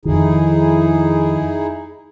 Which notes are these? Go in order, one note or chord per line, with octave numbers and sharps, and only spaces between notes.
F2 D#3 D#4 E4 G#4